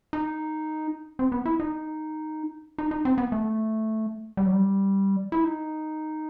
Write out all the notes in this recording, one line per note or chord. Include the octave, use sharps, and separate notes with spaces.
D#4
C4
B3
E4
D#4
D#4
D#4
C4
B3
A3
G3
F#3
G3
E4
D#4